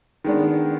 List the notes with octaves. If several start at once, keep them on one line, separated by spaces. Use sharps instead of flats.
D#3 G#3 B3 D4